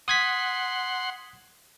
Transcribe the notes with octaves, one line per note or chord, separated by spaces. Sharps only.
F#5 C6 D#6 G#6 B6